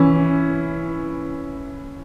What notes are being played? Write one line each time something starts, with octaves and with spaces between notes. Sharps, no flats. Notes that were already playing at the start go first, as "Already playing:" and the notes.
Already playing: E3 C#4 E4